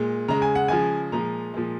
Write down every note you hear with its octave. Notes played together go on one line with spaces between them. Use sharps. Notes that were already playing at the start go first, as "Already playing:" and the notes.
Already playing: A#2 G#3
C#3 G#3 A#5
G#5
F#5
C#3 F3 G#3 G#5
A#2 F3 G#3 A#5
A#2 F3 G#3